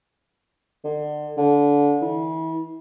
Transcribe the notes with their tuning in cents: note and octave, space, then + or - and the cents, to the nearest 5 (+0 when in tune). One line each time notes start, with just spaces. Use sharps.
D3 +30
D3 -25
E3 -35